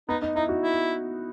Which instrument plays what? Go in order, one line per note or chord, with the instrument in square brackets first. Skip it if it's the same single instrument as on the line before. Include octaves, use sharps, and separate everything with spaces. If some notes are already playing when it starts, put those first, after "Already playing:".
[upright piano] B3 [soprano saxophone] D#4
[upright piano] D#4
[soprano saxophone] D#4 [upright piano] E4
[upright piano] F#4
[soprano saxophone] E4